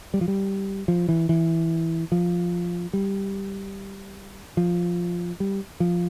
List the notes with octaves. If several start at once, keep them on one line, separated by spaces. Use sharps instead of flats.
G3
F3
G3
F3
E3
E3
F3
G3
F3
G3
F3